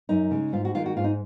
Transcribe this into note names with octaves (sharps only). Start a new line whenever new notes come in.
F#2 D#4
C#3 G#3
G#2 F4
F#4
D#3 G#3 F4
F#4
G#2 F4
D#4